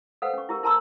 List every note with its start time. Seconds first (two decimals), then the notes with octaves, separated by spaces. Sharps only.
0.22 A4 B4 C5 F5 F#5
0.33 C#4 C#6
0.49 E4 G4 A#4
0.63 E4 A#4 A5 A#5 C6 E6